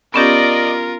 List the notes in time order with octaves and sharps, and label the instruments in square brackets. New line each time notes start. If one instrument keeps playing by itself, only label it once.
[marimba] B3 C#4 G4 [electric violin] F4 A#4 [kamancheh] D5 D#5